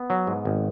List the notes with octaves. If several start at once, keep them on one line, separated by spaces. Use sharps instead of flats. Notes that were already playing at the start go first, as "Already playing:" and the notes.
Already playing: B3
F#3
G#2
G#1